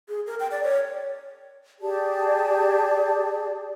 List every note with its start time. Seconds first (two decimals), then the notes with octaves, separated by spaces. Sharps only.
0.09 G#4
0.27 A#4
0.40 G5
0.51 D5
0.64 C#5
1.82 G4 G#4 D5 A5